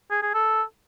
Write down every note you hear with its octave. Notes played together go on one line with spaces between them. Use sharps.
G#4
G#4
A4